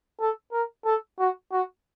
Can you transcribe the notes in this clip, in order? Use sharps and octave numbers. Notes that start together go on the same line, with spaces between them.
A4
A#4
A4
F#4
F#4